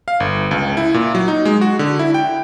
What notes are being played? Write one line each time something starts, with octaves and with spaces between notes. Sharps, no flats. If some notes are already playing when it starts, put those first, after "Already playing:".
F5
G1
C#2
E4
A#2
F#3
D#4
G#3
F#4
D3
E4
G5